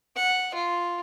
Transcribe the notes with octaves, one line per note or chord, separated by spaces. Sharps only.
F#5
F4